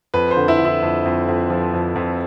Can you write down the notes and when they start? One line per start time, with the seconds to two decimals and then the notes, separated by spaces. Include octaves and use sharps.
0.14 F2 B4
0.31 C5
0.37 D3
0.48 E4
0.59 D3
0.65 E4
0.83 F2
1.06 F2
1.28 F2
1.50 F3
1.73 F2
1.96 F2